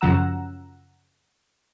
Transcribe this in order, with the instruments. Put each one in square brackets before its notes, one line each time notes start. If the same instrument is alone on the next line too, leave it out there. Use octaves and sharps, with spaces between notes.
[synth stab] F#2 C#3 F3 F#5 A#5 E6